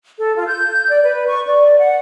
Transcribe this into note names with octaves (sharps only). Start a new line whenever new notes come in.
A4
F4
G6
D5
B4
C#6
D5
F#5